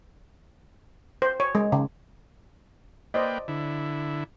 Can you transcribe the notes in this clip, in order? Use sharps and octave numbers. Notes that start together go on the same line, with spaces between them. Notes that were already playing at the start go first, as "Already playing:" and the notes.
C5
C#5
G#3
C#3
A#3 B4 C5 D5 D#5 G5
D3 E4